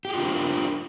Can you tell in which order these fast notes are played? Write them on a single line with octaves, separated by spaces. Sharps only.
G4 G#4 F4 D4 A#4